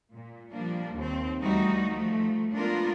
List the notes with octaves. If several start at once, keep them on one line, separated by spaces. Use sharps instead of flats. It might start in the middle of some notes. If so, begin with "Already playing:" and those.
A#2
F3 G3 A#3 D4
D#2 C4
D2 E3 G3 D#4 F#4
F3 A3
G#3 A#3 B3 D4 F4 A#4